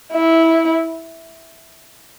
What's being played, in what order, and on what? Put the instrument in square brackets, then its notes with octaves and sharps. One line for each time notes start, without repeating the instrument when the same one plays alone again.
[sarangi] E4